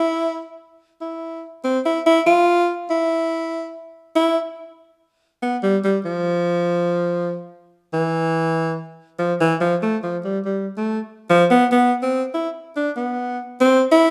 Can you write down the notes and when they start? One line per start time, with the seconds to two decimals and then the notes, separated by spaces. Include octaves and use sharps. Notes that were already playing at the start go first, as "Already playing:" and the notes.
Already playing: E4
1.01 E4
1.64 C4
1.86 E4
2.06 E4
2.27 F4
2.90 E4
4.16 E4
5.42 B3
5.63 G3
5.84 G3
6.05 F3
7.93 E3
9.19 F3
9.40 E3
9.61 F3
9.82 A3
10.03 F3
10.25 G3
10.45 G3
10.77 A3
11.30 F3
11.51 B3
11.72 B3
12.02 C4
12.34 E4
12.76 D4
12.96 B3
13.60 C4
13.92 E4